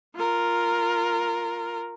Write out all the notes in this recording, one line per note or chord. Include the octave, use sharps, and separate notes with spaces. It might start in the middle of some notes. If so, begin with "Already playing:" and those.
F4 A#4